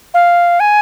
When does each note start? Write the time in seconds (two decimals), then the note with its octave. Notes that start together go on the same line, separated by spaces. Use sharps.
0.14 F5
0.60 G#5